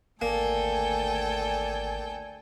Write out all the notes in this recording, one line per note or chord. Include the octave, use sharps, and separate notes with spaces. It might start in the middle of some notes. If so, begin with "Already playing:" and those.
G#1 D2 A#3 A4 D5 G5 G#5